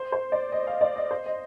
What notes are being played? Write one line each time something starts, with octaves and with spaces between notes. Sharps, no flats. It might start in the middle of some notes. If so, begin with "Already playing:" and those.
Already playing: C5
C5
D5
D#5
F5
D5
D#5
C5
D#5